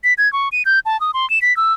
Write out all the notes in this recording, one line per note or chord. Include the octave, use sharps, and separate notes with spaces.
B6
G#6
C#6
D#7
G6
A5
D#6
C6
E7
B6
E6